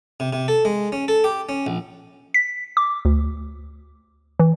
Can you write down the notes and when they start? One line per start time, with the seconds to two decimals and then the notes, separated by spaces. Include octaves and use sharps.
0.20 C3
0.33 C3
0.48 A4
0.65 G#3
0.92 C#4
1.08 A4
1.24 G4
1.49 C#4
1.66 A#1
2.34 B6
2.77 D6
3.05 D2
4.40 E3